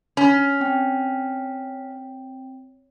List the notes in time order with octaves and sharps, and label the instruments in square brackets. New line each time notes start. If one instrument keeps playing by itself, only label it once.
[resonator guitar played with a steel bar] C#4
[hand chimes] C4 G5